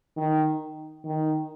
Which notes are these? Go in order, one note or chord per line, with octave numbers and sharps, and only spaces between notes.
D#3
D#3